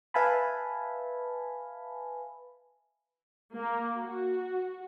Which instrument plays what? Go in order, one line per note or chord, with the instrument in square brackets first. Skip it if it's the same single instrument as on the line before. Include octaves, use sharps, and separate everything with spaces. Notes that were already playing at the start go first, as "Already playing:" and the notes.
[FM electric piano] B4 E5 F5 G#5 A5 B5
[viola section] A#3
F#4